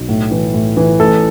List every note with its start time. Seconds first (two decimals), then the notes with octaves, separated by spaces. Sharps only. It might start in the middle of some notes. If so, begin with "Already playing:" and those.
Already playing: B1
0.09 A2
0.31 E3
0.54 A2
0.77 E3
1.00 A1 A4